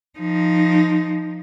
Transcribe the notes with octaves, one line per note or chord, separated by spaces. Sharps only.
F3 D#4